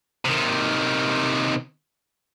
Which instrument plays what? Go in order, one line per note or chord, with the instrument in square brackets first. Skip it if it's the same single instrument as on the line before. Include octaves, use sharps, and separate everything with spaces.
[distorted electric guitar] C3 D#3